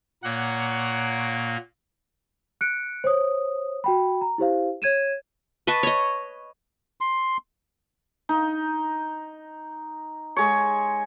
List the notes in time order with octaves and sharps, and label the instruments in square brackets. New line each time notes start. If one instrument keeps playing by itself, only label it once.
[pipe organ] A#2 A#3 [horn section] C#5 F#5 A#5
[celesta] F#6 C#7 D7
C5 C#5 D#6
F#4 G5 B5
A#5
E4 G4 C5 F5
C#5 G#6 D#7 E7
[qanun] B4 D#5 A5 C#6
C#5 D#5
[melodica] C6
[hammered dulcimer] D#4
G#3 C#5